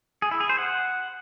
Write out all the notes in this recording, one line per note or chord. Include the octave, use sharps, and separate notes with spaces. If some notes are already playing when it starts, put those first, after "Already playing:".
G#4
E4
G#4
C5
F#5